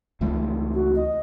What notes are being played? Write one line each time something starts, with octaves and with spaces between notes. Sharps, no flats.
C#2 E3 A3
F#4
D#5